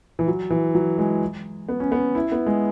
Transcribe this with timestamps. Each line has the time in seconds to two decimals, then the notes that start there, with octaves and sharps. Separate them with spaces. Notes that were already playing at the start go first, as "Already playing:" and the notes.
0.19 E3
0.28 F#3
0.50 E3
0.75 F#3
0.98 G#3
1.69 B3
1.80 C#4
1.92 B3
2.15 E4
2.32 B3
2.46 G#3